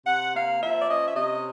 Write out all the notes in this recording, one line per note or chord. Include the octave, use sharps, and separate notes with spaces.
C3 F#5
A#3 F5
F3 E5
D5
C#4 D#5
E5
C3 D#5